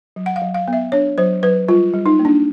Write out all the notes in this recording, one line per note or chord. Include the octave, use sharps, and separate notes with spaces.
F#3
F#5
F5
F#3
F5
B3
E5
D4 C#5
F#3 C5
F#3 B4
G3 F4
G3
D#4
A#3
D4